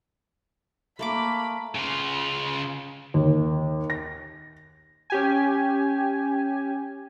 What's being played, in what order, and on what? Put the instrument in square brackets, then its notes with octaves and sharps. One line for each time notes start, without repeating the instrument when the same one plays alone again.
[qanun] A3 A#3 D6 [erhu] B5
[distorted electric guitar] C#3 F4
[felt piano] D#2
A#6
[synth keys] C#4 G4 G#5